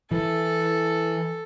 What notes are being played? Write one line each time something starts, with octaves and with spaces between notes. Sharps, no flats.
E3 A4